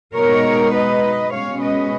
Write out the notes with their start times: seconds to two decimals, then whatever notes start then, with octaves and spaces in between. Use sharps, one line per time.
0.14 B2 G#3 D#4 A#4 C#5
0.73 B4 D#5
1.31 B2 G#3 C#4 C#5 F5
1.61 B4 D#5